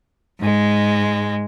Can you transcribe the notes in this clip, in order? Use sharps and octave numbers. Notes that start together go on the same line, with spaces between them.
G#2 G#3